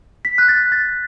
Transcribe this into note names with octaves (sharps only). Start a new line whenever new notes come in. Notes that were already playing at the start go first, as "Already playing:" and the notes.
B6
F#6
A6
A6